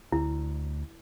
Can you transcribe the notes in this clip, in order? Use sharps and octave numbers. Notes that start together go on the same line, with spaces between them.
D2 E4